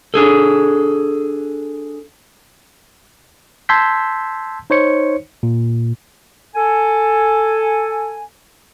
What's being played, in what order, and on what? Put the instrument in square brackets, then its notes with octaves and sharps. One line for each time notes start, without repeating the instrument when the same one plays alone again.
[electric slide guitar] D4 G#4 A4
[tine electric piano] A5 C6 E6 G6 G#6 B6
D#4 C5 C#5 C#7
A#2
[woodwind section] A4 G#5